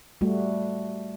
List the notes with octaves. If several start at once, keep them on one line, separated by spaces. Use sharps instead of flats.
G3 A3 F#4